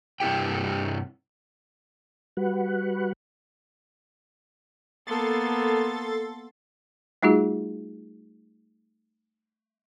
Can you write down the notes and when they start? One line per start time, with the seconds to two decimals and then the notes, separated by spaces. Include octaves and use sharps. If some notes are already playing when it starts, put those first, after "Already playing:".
0.20 G2 C3 E4 G4 G5
2.37 G3 F#4 B4 F#5
5.07 A#3 B3 A4 C6 A6
7.23 G3 A3 D#4 F4 F#4 G#4